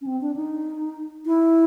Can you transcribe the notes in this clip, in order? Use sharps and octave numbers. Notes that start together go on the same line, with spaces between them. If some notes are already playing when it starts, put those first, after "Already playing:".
C#4
C4
D4
D#4
E4